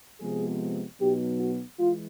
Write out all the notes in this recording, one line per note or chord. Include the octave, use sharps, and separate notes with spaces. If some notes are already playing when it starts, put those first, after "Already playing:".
C3 F3 G#3 B3 G#4
B2 F#3 B3 D#4 G4
F#4
E3 G#3 F4